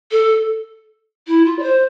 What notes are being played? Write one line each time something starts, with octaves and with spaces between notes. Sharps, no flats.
A4
E4
F4
D5
C5